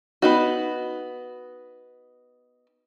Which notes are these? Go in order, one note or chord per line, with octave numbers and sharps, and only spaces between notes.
B3 D#4 F#4